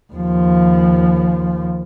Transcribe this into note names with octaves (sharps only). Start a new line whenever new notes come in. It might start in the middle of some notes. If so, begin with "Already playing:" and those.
D#2 F3